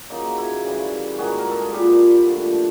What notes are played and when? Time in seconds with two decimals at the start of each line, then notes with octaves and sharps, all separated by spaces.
0.10 C#3 F#3 A#3 D#4
0.38 E4
0.64 C#3 E3 G3
1.18 G#2 D#3 G3 A#3 F#4 G#4
1.39 A#4
1.51 A4
1.61 G#4
1.73 A#2 G3 C4 F4 G4
2.27 D3 F3 A3